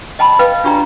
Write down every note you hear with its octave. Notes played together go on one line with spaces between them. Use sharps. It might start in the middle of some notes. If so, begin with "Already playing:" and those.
D#5 G5 A5 B5
B4 D#5 F5 G5
D4 F4 G4 D5 G5 A#5